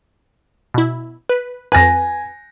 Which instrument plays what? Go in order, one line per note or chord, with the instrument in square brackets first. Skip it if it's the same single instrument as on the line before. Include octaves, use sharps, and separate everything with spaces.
[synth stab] B2 E4
B4
[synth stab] F2 B4 [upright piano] G#5 A#6